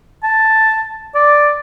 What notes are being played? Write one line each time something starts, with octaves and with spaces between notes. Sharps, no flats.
A5
D5